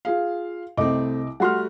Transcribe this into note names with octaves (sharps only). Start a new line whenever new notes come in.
F4 G#4 F5
C2 A3 C4 D#5 D6
G3 A3 F#4 F#5 C6 F6